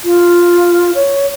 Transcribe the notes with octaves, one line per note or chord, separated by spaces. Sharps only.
F4
C#5